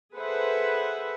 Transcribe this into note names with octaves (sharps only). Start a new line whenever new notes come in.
G#4 A4 B4 C5 E5 F#5